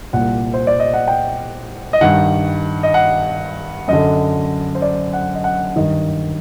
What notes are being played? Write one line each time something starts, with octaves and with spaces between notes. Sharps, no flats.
C2 A#2 F#5
C5
D5
D#5
F#5
G5
D#5
G2 D#3 F#5
D#5
F#5
F#2 D3 D#5
C5
D5
F#5
D#5
F#5
G2 D#3 D#5